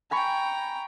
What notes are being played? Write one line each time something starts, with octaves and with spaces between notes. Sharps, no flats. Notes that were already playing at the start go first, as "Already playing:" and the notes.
G5 G#5 A#5 B5 C#6